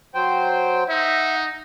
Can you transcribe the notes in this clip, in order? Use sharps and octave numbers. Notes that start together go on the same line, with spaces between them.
F#3 C5 G5
D#4 E5 F#5